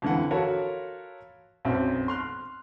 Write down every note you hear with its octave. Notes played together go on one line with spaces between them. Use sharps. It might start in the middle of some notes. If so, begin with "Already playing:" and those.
F2 D3 E3 F4 F#5
F4 F#4 A4 A#4 C#5 B5
B1 F#2 B3 C4 F#4 E5
C6 F6 F#6